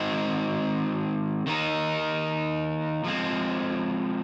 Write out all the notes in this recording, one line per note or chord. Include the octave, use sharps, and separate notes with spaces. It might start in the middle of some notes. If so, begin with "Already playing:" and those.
Already playing: D#3 G#3 C4
D#3 A#3 D#4
F3 G#3 C4